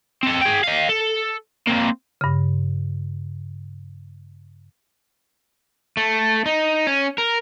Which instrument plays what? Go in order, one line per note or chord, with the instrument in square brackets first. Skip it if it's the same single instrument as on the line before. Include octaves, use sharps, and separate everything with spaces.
[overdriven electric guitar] C4 A4
G#4 G5
D#5 F5
A4
A#3 C4
[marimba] G2 C#3
[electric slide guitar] A3
D#4
C#4
A#4